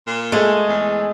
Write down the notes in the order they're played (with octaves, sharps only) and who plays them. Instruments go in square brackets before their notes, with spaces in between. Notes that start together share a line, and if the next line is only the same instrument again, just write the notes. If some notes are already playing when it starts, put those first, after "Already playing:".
[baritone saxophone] A#2
[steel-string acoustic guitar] G#3 [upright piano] A3 G#4
[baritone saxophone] E2